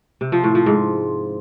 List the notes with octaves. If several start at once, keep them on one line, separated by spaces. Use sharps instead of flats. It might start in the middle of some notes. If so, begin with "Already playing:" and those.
C3
F3
A2
F3
G#2